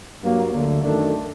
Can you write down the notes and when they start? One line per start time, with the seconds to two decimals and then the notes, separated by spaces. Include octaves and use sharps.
0.21 G2 F#3 A#3
0.52 D2 D3 A3
0.83 F#2 D#3 A3 D4 A4